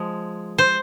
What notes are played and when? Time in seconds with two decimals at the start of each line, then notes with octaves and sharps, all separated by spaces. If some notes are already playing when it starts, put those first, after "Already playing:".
Already playing: F3 G#3
0.58 C5